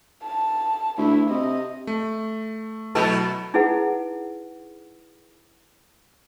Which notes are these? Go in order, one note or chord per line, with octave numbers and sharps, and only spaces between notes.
A5
D2 E4
C3 D#5
A3
B2 F#3 A3 E4 A5
D#4 E4 G#4 B4 F#5